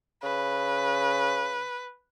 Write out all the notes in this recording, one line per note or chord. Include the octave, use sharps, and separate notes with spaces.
C#3 B4